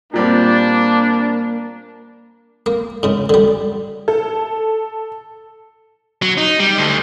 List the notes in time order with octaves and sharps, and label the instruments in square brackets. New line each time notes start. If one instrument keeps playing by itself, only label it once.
[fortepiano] A#2 G3 C4 [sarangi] A#3 [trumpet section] D4
[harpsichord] A#3
G#2 C#3
D3 G3
[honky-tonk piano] A4
[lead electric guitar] F#3
D#4
G3
D2